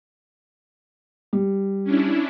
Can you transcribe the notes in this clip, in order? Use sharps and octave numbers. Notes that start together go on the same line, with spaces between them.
G3
C#4 D4 E4